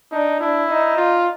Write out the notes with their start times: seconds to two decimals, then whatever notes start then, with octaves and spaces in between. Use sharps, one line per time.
0.11 D4 D#4
0.40 D4 E4
0.69 D#4
0.97 F4